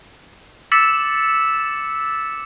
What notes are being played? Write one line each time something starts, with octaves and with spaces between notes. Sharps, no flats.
D6 E6 A6 B6 C#7 E7